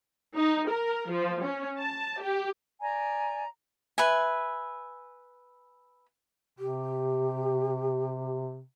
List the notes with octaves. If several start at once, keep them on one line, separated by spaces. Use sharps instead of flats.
D#4
A#4
F3
C#4
A5
G4
D5 G#5 A#5
B4 E5 G#5
C3 G4